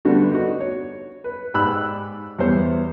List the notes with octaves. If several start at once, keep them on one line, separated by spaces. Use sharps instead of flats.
D3 G3 A3 B3 D4 F#4
D#4 F#4
C#5
B4
G#2 G4 D5 B5 E6 F#6
E2 G3 B3 C5 C#5